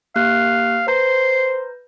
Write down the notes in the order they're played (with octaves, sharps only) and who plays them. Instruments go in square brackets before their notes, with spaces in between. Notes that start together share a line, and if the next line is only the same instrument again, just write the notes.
[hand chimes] A#3 G4 F#6 [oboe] F5
[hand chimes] B4 A#5 G6 [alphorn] C5 [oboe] C6